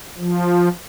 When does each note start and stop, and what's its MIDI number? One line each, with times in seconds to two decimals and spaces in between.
0.18 0.69 53